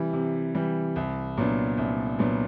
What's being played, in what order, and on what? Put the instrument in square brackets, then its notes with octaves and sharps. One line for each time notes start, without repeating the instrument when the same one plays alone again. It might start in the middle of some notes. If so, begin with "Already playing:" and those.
Already playing: [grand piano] C3 E3 G3
C3
E3 G3
C2
A#2 F#3 B3 D4
C2
A#2 F#3 B3 D4